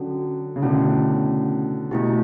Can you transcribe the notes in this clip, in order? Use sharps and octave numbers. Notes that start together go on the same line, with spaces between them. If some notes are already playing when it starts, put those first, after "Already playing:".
Already playing: D3 F#3 C#4 F#4 A4
C#3
B2 D3 A3 C#4 E4
B2 A3 E4 G4